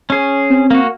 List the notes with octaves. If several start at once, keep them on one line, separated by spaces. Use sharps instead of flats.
C#4 G#4
C4
A#3 F#4